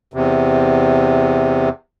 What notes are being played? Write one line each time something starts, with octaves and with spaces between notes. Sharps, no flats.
E2 C3